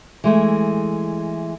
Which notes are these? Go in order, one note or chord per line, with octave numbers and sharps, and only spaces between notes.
E3 G#3 A3